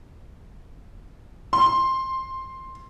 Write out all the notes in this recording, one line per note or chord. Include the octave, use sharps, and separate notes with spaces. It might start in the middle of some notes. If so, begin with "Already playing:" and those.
C6